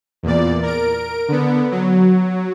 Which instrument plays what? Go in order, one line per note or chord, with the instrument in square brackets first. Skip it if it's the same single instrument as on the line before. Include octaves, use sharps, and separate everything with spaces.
[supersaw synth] E2 A#2 D5
A#4 D7
D3 B3
F#3